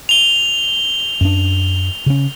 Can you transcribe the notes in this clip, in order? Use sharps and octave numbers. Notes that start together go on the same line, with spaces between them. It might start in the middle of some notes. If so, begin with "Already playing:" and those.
F7 G7
F#2 D4
C#3 C#4